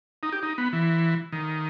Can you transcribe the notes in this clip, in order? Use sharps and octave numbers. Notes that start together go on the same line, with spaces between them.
D#4
G4
D#4
B3
E3
D#3